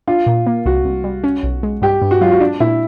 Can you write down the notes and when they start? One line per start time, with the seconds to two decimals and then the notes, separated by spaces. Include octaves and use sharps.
0.07 D4 F4
0.27 A#2
0.47 A#3
0.66 C2 F#4
0.85 C2
1.04 G3
1.24 C#4
1.43 B1
1.63 G#3
1.82 G2 G4
2.02 G2
2.11 F#4
2.21 F#3 F4
2.32 F#4
2.41 D4
2.60 A#2 E4